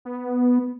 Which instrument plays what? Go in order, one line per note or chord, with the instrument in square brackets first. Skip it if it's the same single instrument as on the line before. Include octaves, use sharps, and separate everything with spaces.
[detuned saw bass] B3